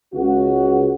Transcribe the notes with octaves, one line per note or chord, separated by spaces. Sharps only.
C#2 F#4